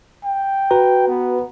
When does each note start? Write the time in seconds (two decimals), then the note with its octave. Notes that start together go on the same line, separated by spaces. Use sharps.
0.24 G5
0.71 F#4 B4 A#5
1.08 B3